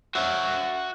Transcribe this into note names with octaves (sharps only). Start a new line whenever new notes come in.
F#4 E5